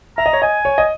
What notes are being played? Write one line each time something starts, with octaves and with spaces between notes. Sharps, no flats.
E5 A#5
D#5
C#5
D#5 G#5
C#5
D#5